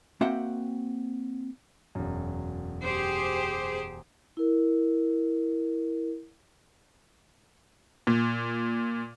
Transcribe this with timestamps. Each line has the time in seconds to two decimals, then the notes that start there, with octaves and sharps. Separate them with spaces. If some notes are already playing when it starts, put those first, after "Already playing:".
0.21 A#3 C4 F#4 E5 F#5 G5
1.95 E1 F#2
2.83 G4 G#4 C5
4.37 E4 A#4
8.07 A#2